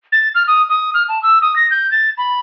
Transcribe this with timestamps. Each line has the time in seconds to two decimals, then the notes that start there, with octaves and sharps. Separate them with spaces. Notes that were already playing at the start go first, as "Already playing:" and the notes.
0.12 A6
0.35 F6
0.48 D#6
0.69 D#6
0.94 F6
1.09 A5
1.23 E6
1.42 D#6
1.56 A#6
1.71 G6
1.92 A6
2.18 B5